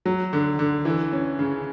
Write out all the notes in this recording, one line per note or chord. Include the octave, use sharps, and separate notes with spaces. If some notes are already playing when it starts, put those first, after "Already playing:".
F#3
D3
D3
E3
C#4
C#3